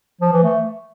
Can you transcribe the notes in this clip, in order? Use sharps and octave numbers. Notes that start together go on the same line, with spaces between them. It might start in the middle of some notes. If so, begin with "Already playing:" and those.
F3
E3
A3